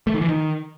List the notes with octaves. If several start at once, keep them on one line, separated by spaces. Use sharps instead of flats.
A3
D#3
E3
D#3